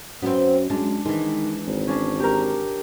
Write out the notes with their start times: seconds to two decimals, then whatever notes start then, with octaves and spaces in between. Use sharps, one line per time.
0.22 F#2 B3 C4
0.70 F#2 G#3 D4
1.05 D#3 E3 G#3
1.67 G#1
1.87 C#4 D4
2.20 G4 A#4